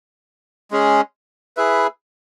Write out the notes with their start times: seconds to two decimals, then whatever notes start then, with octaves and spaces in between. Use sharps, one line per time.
0.71 G#3 C#4 G#4
1.57 E4 G#4 B4 E5